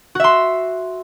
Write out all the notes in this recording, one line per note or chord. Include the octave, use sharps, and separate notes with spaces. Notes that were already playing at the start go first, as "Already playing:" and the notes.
F#4 E5 C6